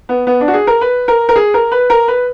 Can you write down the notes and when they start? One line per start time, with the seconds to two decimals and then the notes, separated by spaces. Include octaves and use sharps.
0.09 B3
0.27 B3
0.41 D4
0.48 F#4
0.53 G#4
0.67 A#4
0.81 B4
1.08 A#4
1.29 A#4
1.36 G#4
1.54 A#4
1.72 B4
1.90 A#4
2.08 B4